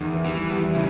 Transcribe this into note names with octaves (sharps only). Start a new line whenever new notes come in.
E2 D#3
E3
E3 G3
G3
E2 G3
C#3 E4